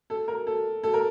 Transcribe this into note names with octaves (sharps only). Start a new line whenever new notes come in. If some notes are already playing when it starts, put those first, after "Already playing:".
A4
A#4
A4
A4
A#4